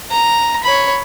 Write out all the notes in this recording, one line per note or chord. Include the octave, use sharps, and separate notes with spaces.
A#5
C#5 B5